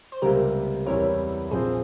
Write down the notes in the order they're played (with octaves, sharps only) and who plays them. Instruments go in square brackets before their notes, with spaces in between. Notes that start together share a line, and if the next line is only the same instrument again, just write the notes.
[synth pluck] C5
[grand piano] C#2 C3 G3 A#3 [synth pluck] G4 A#4
[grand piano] E2 E3 G3 C4 E4 [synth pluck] A#4 C#5
[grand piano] A#1 A#2 F3 C4 [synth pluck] G#4 C5